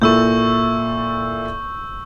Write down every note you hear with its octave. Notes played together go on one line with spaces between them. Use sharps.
A#2 E4 A4 C#6 E6 G6